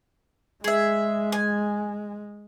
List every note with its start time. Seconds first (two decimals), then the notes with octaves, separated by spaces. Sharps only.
0.64 G#3 G#4 E5
1.32 G#5